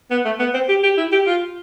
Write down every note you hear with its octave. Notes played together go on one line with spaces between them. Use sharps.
B3
A3
B3
C4
G4
G4
E4
G4
F4